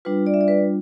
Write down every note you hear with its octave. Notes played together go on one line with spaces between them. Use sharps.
G3 D4 F4 B4
D5
E5
D5
B4